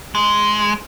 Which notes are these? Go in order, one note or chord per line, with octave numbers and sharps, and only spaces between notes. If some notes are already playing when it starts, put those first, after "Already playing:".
G#3